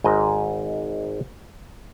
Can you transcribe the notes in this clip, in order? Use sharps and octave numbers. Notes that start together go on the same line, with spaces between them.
G#1 G#2 D#5